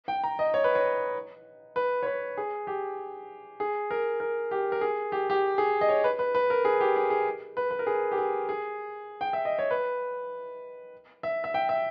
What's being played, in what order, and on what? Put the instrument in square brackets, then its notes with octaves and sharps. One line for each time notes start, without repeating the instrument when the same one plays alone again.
[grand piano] G5
A#5
D#5
C#5
B4
C#5
B4
C#5
B4
G#4
G4
G#4
A#4
A#4
G4
A#4
G#4
G4
G4
G#4
D#5
C#5
B4
B4
B4
A#4
G#4
G4
G#4
G#4
B4
B4
A#4
G#4
G4
G#4
G#4
G5
E5
D#5
C#5
B4
E5
E5
G5
E5